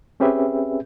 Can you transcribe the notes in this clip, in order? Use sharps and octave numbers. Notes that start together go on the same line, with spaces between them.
C4 C#4 G4 G#4 B4 E5